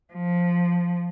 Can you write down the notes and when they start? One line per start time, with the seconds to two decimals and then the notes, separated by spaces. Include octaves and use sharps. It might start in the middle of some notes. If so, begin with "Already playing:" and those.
0.13 F3